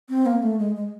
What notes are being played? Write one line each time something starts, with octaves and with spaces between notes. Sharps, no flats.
C4
A#3
A3
G#3
G#3